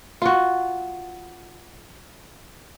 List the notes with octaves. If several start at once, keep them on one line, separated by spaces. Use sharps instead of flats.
F4 F#4